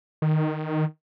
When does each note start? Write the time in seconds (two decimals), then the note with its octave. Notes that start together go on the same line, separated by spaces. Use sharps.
0.22 D#3